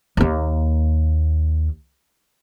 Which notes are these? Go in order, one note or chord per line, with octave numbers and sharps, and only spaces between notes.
D#2 A#3